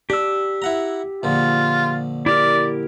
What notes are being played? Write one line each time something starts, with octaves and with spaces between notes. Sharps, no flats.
D4 G4 E6
E4 F#5 A#5
A#1 D3 F4
E4 G4 A#4 D5